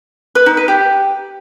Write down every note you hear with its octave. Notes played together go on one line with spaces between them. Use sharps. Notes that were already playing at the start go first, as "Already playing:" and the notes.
B4
D#4
B4
G4